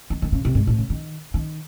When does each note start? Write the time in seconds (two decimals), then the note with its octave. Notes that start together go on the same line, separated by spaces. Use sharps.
0.10 D#3
0.22 D#3
0.32 C#3
0.45 C3
0.55 G#2
0.67 A2
0.78 C#3
0.90 D#3
1.34 D#3